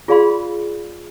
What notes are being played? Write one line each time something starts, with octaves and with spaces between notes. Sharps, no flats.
F4 G#4 D5 F5 B5 C6